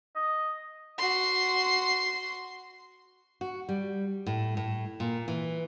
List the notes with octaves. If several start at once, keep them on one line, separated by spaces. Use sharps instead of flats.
D#5
F#4 C6
F#4
G3
A2
A2
A#2
E3